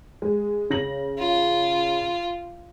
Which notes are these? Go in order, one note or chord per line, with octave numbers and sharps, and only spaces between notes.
G#3
C#3 A#6 F#7
F4